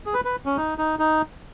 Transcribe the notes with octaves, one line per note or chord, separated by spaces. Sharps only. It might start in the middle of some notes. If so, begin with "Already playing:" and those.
G#4
B4
B4
C#4
D#4
D#4
D#4